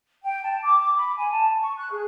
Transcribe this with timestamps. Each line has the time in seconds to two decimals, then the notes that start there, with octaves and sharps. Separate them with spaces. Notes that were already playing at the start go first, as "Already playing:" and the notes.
0.24 G5
0.43 A5
0.63 D6
0.79 D6
0.96 B5
1.17 G#5
1.32 A5
1.60 C#6
1.78 F#6
1.91 G#4